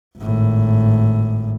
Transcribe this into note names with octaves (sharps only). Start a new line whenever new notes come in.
G#1 A2